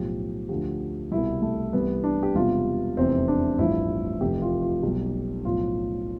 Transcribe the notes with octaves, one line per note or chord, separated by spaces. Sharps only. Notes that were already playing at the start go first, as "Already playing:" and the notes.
Already playing: B1 A2 F3 G4
D2 D3 F3 G4
C2 B2 G3 E4
A3
C2 C3 E3 G3 B3
D4
G4
E1 E2 C3 G3 F4
F1 E2 C3 E3 C4
D4
A1 G2 F3 E4
F1 F2 E3 G4
F4
F4
B1 B2 G3 G4
B1 A2 F3 F4